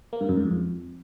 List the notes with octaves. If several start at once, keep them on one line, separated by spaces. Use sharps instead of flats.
A#3
G2
F#2
G#2
F2